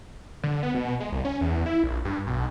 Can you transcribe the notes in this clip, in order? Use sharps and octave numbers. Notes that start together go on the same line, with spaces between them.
D3
B3
B2
G#3
C2
C#4
E2
E4
A#1
G2
B1